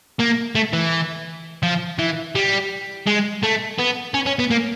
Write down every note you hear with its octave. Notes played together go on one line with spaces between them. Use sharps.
A#3
A3
E3
F3
E3
G3
G#3
A3
B3
C#4
C#4
B3
A#3